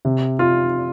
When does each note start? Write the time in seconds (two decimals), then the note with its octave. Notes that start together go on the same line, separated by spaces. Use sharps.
0.05 C3
0.39 F4